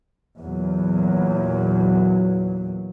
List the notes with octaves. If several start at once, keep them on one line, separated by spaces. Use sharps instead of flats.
E2 A#2 F#3